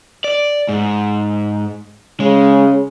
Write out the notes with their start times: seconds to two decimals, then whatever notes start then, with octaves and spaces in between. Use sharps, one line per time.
0.24 D5
0.69 G#2
2.20 C#3 G#3